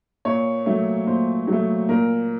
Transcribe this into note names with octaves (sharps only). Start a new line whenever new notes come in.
A#2 C#5
F#3 A3
A#2 C5
F#3
A3
A#2 A#4